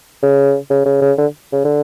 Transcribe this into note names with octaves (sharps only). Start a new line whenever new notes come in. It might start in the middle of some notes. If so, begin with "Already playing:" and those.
C#3
C#3
C#3
C#3
D3
C#3
D3